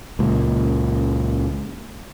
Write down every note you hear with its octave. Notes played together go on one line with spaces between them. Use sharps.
C#2 A#2